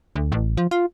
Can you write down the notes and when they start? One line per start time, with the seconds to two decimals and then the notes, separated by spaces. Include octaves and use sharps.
0.16 D2
0.32 A1
0.57 F3
0.71 F4